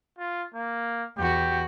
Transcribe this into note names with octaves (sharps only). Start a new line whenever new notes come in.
F4
A#3
E2 F#4 G4